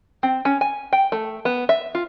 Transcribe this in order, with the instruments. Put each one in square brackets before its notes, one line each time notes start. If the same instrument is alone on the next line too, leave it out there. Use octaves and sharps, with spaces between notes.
[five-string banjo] C4
C#4
G#5
G5
A3
B3
E5
F4